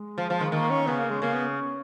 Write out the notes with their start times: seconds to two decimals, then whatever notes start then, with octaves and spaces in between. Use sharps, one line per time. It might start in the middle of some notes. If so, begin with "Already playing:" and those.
Already playing: G#3
0.18 F3
0.30 F3
0.41 D#3
0.52 D#3 A#3
0.70 C#4
0.87 C#3 B3
0.99 A#3
1.10 G#3
1.22 C#3 A#3
1.33 B3